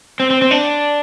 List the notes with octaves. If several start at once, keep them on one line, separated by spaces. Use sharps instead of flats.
C4
C4
C4
D4